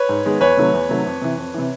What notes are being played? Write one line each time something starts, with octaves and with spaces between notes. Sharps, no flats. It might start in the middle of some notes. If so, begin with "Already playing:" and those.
Already playing: B4 C#5
G#2
D#3 G#3 B3
E2 B4 C#5
C3 D#3 F#3 A3
E2
C3 D#3 F#3 A3
F2
C3 E3
F2
C3 E3